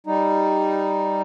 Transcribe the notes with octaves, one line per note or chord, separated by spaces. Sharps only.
G3 D#4